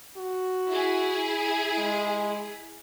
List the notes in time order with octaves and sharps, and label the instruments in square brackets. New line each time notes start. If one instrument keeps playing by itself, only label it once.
[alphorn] F#4
[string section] E4 G#4
[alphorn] G#3